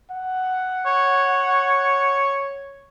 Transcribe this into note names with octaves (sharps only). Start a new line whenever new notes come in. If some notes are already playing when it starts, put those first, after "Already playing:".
F#5
C#5